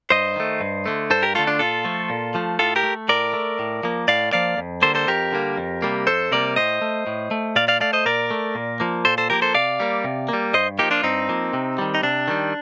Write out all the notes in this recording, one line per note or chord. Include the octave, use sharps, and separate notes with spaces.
G2 C5 D#5
D#3 A3
G2
D3 A3
G2 A4 C5
G4 A#4
D3 A3 F4 A4
D4 F4
A#2 F4 A4
F3 A3
A#2
F3 A3
A2 F4 A4
G4 A#4
A3
A2 A#4 D5
A3
A2
F3 A#3
A2 D5 F5
F3 A#3 D5 F5
F2
D3 G3 A#3 A4 C5
A4 C5
F2 G4 A#4
D3 G3 A#3
F2
C3 G3 A#3
F2 A4 C5
C3 G3 A#3 A#4 D5
A2 C5 D#5
A3
A2
A3
A#2 D5 F5
D5 F5
A3 D5 F5
C5 D#5
A#2 A#4 D5
A3
A#2
F3 A#3
A#2 A4 C5
A4 C5
F3 A#3 G4 A#4
A4 C5
C3 D5 F5
G3 A#3
C3
G3 A#3
G2 C5 D#5
F3 A#3 D#4 G4
D4 F4
G2 C4 D#4
F3 A#3
C3
D#3 G3
D#4
C3 D4
D#3 G3